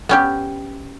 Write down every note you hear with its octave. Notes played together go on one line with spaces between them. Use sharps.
B3 C#4 G4